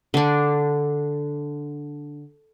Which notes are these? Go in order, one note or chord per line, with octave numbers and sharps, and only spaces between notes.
D3 D4